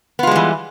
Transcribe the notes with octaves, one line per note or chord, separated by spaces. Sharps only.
E3 G3 G#3 B3 F4